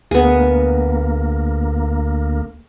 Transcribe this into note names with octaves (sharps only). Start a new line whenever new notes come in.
D2 A#3 B3 G#4